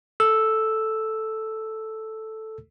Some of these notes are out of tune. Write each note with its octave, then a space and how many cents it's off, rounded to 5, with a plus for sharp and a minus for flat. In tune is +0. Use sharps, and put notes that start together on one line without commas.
A4 +0 E6 +0